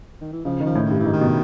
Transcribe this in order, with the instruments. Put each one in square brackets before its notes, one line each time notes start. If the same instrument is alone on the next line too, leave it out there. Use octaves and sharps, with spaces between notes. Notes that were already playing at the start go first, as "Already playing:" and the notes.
[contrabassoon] D#3
E3
[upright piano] C#3 [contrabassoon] F3
[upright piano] D#3
[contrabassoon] F3
[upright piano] A2
[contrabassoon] D#3
[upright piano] G2
[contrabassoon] E3
[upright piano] G#2
[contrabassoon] D#3
[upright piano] B2